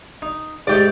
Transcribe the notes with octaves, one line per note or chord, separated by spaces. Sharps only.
D#4
G#2 A3 G4 D5